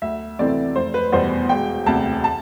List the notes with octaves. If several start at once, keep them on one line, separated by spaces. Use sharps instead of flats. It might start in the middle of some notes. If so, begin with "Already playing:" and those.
D2 E5
C3 E3 A3 C4 D5
F1 C5
B4
E2 B2 G3 B3 C5
E1 G5
D2 C3 A5
A5